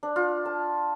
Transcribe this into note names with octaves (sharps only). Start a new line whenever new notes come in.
D4
F4
A5